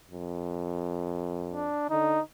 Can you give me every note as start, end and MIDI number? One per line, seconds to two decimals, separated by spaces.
0.10 1.76 41
1.52 1.89 62
1.90 2.19 50
1.90 2.21 63